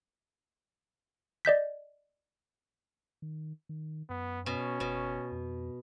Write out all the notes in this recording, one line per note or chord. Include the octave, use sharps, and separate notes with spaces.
D5 D#5 G6 B6
D#3
D#3
F#2 B3
B2 C#4
F#1 B2
F2